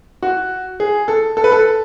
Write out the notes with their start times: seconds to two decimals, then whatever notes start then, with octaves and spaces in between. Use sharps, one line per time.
0.23 F#4
0.80 G#4
1.08 A4
1.37 A4
1.44 B4
1.52 A4